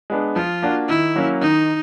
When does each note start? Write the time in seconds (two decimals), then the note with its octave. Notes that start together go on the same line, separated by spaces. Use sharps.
0.10 G#3 B3 D4
0.36 F3 F4
0.62 A#3 D4 F#4
0.88 D#3 E4
1.16 F#3 A#3 C#4
1.41 D#3 D#4